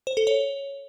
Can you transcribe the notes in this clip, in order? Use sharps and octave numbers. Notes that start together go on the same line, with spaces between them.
C5
A4
C#5